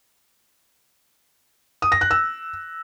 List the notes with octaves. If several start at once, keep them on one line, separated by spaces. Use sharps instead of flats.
D#6
A#6
F#6
E6